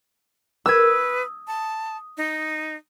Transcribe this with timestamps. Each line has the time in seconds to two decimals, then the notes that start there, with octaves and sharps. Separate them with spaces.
0.66 G#4 A#4 B4 E6 G#6
0.85 D#6
1.47 A5
2.17 D#4